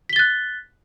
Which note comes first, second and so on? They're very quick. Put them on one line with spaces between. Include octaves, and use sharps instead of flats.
B6 G7 A6 F#6